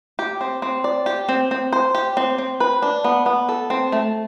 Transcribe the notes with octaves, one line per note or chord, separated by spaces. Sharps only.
G4
C4
C4
D5
G4
C4
C4
C5
G4
C4
C4
B4
D4
B3
B3
A4
C4
A3